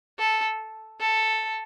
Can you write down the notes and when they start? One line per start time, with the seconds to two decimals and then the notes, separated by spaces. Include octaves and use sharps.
0.19 A4
1.00 A4